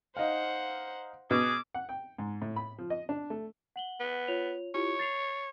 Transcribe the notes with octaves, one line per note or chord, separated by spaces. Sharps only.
D#4 C5 F5 F#5
B2 G#4 D6
F#5
G5
G#2
A2
B5
F3
D#5
D4
A3
F#5 F#7 G7
B3
F4 C#5 F7
E4 F4 G4 C#5
A6 C7 F7